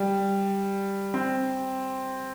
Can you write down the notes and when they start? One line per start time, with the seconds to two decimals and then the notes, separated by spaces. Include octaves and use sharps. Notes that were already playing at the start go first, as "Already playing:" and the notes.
Already playing: G3
1.14 C4